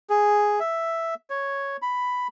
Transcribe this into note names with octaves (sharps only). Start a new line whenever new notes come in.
G#4
E5
C#5
B5